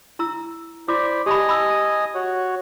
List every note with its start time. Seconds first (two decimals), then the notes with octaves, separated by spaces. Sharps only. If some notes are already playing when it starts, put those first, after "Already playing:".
0.19 E4 A#5 E6
0.88 E4 C5 D5 B5 D6
1.26 G4 D#5 G#5 A5 B5 D#6
1.49 B5 E6
2.15 F#4 C#5